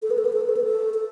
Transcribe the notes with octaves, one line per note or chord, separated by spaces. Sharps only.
A4
B4
A4
B4
A4
B4
A4
B4
A4
A4